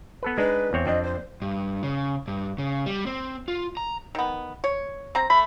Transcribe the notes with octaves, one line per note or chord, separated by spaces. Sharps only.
B3 A4 B4
G#3 D4 D#4 B4
E2 C4 C#5
F2 C4 D4 D#5
C5
G2
C#3
G2
C#3
G3
C4
F4
A#5
D#3 B3
C#5
C4 A#5
A3 B5